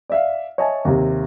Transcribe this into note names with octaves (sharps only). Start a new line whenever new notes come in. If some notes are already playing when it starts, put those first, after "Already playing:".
D5 E5 F5
C#5 D#5 E5 G#5 A5
D#2 C3